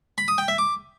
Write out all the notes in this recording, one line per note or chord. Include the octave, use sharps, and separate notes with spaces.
B5
D#6
G5
E5
D6